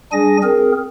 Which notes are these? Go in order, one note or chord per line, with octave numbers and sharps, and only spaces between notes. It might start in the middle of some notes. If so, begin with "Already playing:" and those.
G3 D4 G#4 G#5 A#6
C4 G#4 A#4